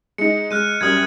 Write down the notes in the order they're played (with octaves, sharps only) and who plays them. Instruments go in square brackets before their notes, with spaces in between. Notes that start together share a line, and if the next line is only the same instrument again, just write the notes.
[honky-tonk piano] G#3 D#4 [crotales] C#7
[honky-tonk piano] G#3 [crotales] F6 F#6 D#7
[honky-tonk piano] F#2 G3 [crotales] D#6 G#6